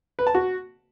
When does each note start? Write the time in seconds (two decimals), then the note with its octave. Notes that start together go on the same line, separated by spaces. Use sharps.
0.19 B4
0.27 A5
0.35 F#4